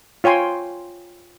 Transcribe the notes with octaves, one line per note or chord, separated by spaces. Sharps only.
F4 C#5 G5 G#5 C6